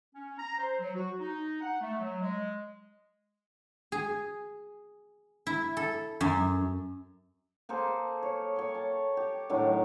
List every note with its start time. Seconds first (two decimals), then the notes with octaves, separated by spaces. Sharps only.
0.15 C#4
0.38 A#5
0.59 C5
0.79 F#3
0.95 F#4
1.20 D#4
1.62 F#5
1.81 A3
2.00 F#3
2.21 G#3
3.92 G#4
5.47 E4
5.77 A4
6.21 F#2
7.69 A#3 G#4 A4 C5
8.23 C#5
8.56 C#5 G5
8.74 A5
9.17 G4
9.49 A2 D#3 F#3 D4